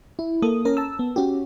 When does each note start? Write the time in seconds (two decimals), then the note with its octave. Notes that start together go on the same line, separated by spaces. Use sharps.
0.19 E4
0.42 A#3 A4 D#6
0.65 C#4 A#4 A#5
0.77 A5 E6
0.99 B3
1.16 C#4 F#4 G4